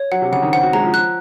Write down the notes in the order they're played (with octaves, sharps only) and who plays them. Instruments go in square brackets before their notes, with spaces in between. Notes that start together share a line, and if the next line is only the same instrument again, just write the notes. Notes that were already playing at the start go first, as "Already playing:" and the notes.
Already playing: [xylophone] C#5
[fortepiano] F#3 [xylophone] F#5
[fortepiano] C3
[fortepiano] C#3 [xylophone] F#5
[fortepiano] D#3
[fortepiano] C4 [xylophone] F#5
[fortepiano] F#4
[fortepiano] G#3 [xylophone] A#5
[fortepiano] F3
[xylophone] F#6